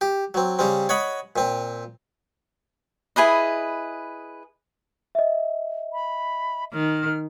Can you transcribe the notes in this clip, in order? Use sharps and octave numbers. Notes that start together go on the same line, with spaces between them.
G4
F#3 C4
C#3 G3 C4
C#5 D#5 F#5 B5
A#2 C4
E4 G#4 B4 D#5
D#5 E5
B5
D#3 F6